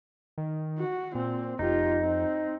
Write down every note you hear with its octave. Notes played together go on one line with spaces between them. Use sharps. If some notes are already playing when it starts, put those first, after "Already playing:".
D#3
F#4
A#2 C4
F1 D#4 F4 G4
C4